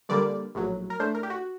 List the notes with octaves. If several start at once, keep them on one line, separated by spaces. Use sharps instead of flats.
G2 D3 G3 A#3 D5
A#1 A2 F#3
A#4
A2 A3 D4 C5
A#4
G4
F#4